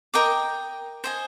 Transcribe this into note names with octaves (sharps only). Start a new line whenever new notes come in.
A#4 D#5 G5 D6
C5 D#5 G#5